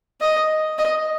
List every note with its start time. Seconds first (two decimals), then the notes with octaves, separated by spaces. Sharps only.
0.21 D#5
0.78 D#5